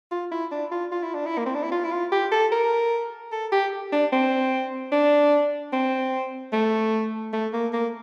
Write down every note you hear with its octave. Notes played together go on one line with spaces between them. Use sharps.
F4
E4
D4
F4
F4
E4
D4
E4
A#3
C4
D4
E4
F4
E4
F4
G4
A4
A#4
A4
G4
D4
C4
D4
C4
A3
A3
A#3
A#3